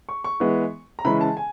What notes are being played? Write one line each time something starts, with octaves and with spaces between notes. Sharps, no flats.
C#6
C#6
E3 G#3 B3
A#5
C#3 E3 G#3 C#4 B5
A5
G#5